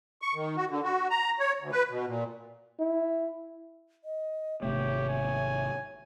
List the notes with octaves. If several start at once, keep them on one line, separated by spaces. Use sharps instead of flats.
C#6
D#3
F#4
D3
F#4
A#5
C#5
D2
B4
B2
A#2
E4
D#5
G#1 C3 A3 G4 C#5 E5
G#5